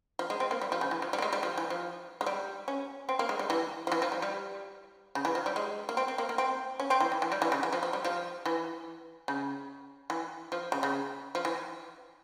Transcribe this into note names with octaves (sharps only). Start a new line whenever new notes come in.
F3
G#3
C4
A#3
G3
F3
C#3
E3
F3
G3
A#3
G#3
G3
F3
E3
F3
G#3
G3
C#4
C4
A#3
G#3
G3
E3
F3
E3
F3
G3
G3
C#3
E3
F3
G3
G#3
A#3
C4
C4
A#3
A#3
C4
C#4
C4
E3
E3
E3
G3
E3
C#3
E3
F3
F3
G3
F3
E3
C#3
E3
F3
C#3
C#3
F3
E3